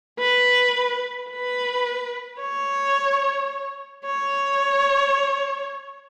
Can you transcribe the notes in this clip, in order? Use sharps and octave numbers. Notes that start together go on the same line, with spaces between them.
B4
B4
C#5
C#5